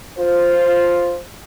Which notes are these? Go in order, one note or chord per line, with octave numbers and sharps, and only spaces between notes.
F4 C5